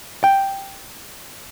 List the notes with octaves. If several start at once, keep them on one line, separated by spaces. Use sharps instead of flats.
G5